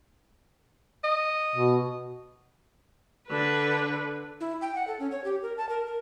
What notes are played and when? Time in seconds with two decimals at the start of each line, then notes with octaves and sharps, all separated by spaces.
1.04 D#5
1.55 B2
3.28 D3 B4
4.41 E4
4.62 G5
4.75 F#5
4.87 A4
5.00 C#4
5.11 C#5
5.24 G4
5.42 A#4
5.58 A5
5.69 A#4
5.86 A#4